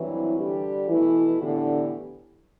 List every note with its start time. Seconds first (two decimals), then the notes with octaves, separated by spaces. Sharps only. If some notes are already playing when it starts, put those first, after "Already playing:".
Already playing: G2 E3 F#3 C4 E4
0.36 D3 G3 D4 G4
0.88 B2 E3 A3 E4
1.42 A2 D3 E3 B3 D4 G4